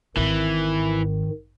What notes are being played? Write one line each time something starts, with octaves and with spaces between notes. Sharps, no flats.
G#1 G#2 D#3 E3